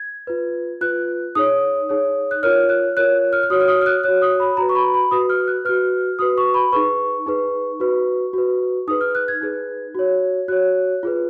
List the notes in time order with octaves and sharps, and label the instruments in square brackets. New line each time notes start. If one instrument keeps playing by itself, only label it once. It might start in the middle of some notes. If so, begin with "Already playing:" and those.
Already playing: [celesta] G#6
F4 B4
F4 B4 F#6
D#4 G#4 C#5 D#6
D#4 G#4 C#5
F#6
F4 A#4 C#5 F6
F#6
F4 A#4 C#5 F#6
F6
F6
F#4 C#5 D#6
F6
D#6
F6
F#6
F#4 C#5 F#6
D#6
B5
F#4 B4 A#5
C#6
B5
B5
F#4 B4 D#6
F6
F#6
F#4 B4 F6
F#4 B4 D#6
C#6
B5
D#4 G#4 B4 C#6
D#4 G#4 B4
F#4 B4
F#4 B4
D#4 G#4 B4 D#6
F6
F#6
G#6
D#4 G#4 B4
F#4 C#5
F#4 C#5 F#6
F4 G#4 B4